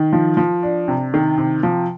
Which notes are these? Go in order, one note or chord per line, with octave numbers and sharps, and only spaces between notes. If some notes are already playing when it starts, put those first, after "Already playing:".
Already playing: D#3
F3
F3
D4
C3
D#3
C3
F3